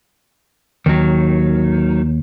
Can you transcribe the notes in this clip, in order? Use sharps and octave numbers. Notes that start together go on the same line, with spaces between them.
D#2 D#3 F#3